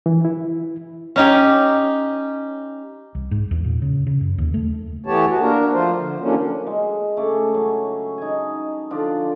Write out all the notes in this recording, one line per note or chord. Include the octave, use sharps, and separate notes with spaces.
E3
E4
C#4 D#4 G4
C2
G#2
E2
A#2
C#3
C#3
F#2
D#2
A3
E3 A3 B3 G4 C#5 A5
F#4
A#3 D4 A#4
F3 A3 F4 C5
D3
E3 F#3 A3 A#3 C#4 D4
G#3
C#3 A3 D6
F#3 C#4
D#4 G#5
D3 F3 D4 F4